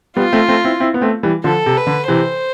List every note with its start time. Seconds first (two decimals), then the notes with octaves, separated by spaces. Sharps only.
0.17 G3 B3 F4
0.33 A3 C4
0.48 A3 C4
0.65 C4 E4
0.80 C4 E4
0.94 B3
1.01 A3 C4
1.23 E3 G3
1.44 D3 F3 A4
1.66 C3
1.77 B4
1.87 D3
2.08 C3 E3 C5